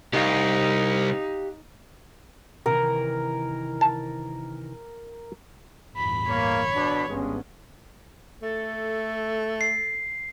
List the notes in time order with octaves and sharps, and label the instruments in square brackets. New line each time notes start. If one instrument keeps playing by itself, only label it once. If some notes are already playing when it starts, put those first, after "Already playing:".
[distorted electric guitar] C2 [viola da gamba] D#4 [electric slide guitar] G4 F5
[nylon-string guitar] C3 D#3 E3 [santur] A#4
[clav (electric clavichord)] A5
[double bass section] G1 E2 A2 [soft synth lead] B5
[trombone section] A#3 [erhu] C#5
[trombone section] B2 D4
[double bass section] G#1 B3 C#4 [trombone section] G2 G#3
[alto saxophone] A3 [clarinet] A4
[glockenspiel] C7